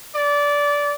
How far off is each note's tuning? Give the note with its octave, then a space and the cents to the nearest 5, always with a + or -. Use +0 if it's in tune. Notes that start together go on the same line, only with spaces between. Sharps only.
D5 -20